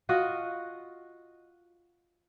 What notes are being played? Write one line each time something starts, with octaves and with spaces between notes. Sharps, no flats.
F4 F#4 D#5